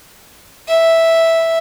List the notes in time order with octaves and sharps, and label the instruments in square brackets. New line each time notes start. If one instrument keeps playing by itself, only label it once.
[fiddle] E5